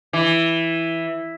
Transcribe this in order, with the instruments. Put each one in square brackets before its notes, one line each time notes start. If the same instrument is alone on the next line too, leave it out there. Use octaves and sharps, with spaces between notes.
[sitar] E3